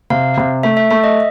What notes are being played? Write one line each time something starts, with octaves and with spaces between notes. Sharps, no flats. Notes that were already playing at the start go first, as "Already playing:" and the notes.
C3 F5
C3
A3 E5
E5
A3 E5
D#5